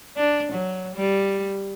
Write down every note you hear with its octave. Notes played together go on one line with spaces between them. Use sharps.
D4
F#3
G3